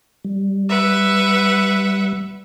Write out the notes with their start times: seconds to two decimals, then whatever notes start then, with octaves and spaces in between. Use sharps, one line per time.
0.25 G3
0.68 B4 E5 F#5